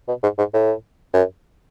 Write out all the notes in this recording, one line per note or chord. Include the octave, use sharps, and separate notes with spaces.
B2
G#2
G#2
A2
F#2